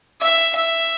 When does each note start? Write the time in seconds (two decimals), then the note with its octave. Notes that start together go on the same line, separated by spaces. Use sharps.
0.22 E5
0.55 E5